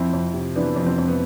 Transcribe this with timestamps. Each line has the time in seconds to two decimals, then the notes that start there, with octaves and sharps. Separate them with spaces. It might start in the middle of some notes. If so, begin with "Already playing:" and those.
Already playing: F2 C4 E4
0.13 F2
0.34 C3
0.56 E3 B3 D4
0.76 F2
0.86 C4
0.98 F2
1.08 B3